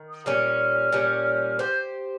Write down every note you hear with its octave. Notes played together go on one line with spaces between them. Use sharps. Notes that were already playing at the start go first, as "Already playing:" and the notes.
Already playing: D#3
D#6
A#2 G3 C#4 F6
A#2 G3 C#4
G4 C5 G6